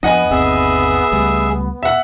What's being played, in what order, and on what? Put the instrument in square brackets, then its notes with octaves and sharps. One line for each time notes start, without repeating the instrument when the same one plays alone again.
[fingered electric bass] F2 F3 D4 [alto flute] B3 [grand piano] D#5 F#5 G#5
[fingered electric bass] G1 D#2 C4 [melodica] G#4 E5
[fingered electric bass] C#2 G3 A3
[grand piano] E5 F#5